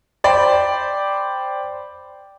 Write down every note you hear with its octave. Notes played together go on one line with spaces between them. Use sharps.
C5 D5 G5 B5